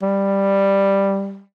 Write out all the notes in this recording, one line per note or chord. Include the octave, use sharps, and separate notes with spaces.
G3